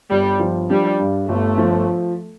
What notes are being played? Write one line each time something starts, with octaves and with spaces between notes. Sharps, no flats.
G1 G3
F3
G3 D4
G2
G1 A3
F3